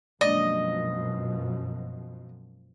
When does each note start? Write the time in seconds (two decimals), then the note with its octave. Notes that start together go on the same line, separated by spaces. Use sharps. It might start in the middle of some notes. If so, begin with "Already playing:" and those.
0.21 F#2 B2 F3 G#3 A#3 D4 D5 D#5